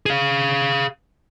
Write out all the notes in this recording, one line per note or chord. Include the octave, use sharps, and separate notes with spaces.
G#4 F5